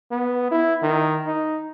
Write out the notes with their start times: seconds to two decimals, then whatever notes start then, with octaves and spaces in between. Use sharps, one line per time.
0.11 B3
0.51 E4
0.82 D#3
1.26 D#4